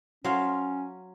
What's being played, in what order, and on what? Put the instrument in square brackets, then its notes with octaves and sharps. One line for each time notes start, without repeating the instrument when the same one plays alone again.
[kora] F#3 [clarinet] C#4 [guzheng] C5 F5 C6